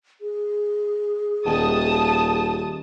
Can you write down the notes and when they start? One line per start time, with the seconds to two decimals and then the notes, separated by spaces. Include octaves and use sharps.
0.21 G#4
1.46 D#1 A5 D#6